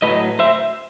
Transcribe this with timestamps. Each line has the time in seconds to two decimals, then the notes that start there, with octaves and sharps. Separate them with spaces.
0.02 A2 F#3 B4 D#5
0.39 C5 E5